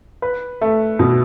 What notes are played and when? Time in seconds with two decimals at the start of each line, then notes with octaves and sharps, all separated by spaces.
0.22 B4
0.61 A3
0.99 B2